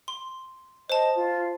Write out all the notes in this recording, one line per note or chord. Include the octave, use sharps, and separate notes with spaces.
C6
C5 D#5 A5
F4